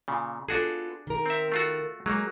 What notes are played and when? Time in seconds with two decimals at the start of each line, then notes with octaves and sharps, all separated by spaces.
0.08 A#2 C#3
0.49 B3 D4 F4 F#4 G#4 A4
1.07 D#3 A#4
1.26 C4 E5
1.52 A3 F4 F#4
2.06 F#3 G#3 A#3